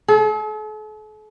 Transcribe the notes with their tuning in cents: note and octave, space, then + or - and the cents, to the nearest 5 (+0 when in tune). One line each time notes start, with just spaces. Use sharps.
A4 -45